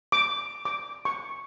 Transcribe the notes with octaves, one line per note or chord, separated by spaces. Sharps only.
D6
D6
C#6